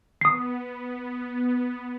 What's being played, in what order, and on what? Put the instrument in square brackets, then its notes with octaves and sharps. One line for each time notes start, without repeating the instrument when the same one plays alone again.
[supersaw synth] B3 [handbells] D#6 C7